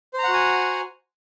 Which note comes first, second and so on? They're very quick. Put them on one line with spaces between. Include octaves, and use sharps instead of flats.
C5 A#5 F#5 F#4 G#5